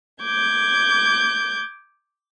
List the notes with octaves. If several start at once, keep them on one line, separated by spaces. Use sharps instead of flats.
D6 G6 G#6